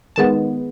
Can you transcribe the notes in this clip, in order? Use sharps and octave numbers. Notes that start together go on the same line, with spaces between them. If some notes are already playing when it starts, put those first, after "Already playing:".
D#3 G#3 B3 A5